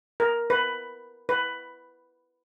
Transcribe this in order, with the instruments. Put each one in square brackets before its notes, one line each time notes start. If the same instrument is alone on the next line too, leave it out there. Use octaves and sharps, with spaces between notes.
[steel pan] A#4
B4
B4